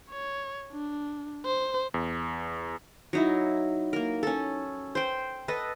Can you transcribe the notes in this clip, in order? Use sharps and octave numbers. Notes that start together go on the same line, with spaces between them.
C#5
D4
C5
E2
F#3 D#4 E4
A#3 A#4
C#4 A4
C5 G5
A4 B4 D#5